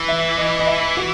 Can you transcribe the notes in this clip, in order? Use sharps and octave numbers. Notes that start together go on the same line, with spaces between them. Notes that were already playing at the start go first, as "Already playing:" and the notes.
Already playing: E3
E5
D#5
D#5
E5
F#4